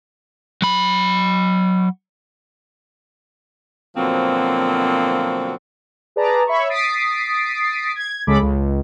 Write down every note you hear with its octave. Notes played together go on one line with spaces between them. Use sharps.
F#3 B5
B2 D3 F3 F#3 A#3 C4
G#4 B4 D5 A5 A#5
C#5 E5 B5 C#6
D#6 A6 B6 C7 D7
G#6
C#2 C#3 G#3 A4 B5 D6
C#2